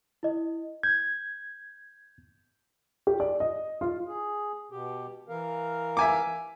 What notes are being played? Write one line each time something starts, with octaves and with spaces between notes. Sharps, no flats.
E4 D#5
G6 G#6
G4
D5
D#5
F4
G#4
B2 G4
E3 A#4 F5
E5 G#5 D6